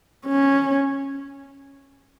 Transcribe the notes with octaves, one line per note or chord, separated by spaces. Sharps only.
C#4